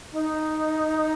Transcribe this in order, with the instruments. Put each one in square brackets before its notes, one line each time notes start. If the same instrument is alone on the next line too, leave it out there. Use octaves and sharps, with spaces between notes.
[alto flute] D#4